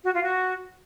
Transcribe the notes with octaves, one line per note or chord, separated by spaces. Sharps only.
F#4
F4
F#4